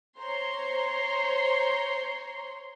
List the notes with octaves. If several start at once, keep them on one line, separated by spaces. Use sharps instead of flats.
C5 C#5 A#5 C6